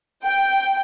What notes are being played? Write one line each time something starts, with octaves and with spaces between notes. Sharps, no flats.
G5